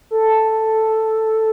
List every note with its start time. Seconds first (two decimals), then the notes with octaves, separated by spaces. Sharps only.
0.11 A4